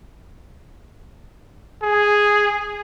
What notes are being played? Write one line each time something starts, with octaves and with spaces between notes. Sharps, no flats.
G#4